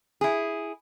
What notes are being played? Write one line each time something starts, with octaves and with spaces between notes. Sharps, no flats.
E4 G#4